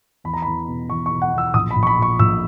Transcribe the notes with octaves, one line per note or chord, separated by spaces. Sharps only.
E2 B5
A#5
E2 B5
B2
E2 C#6
C#6
B2
F#5
E2 E6
A#1 D#6
B5
A#1
C#6
B5
A#2 C#6
A#1 E6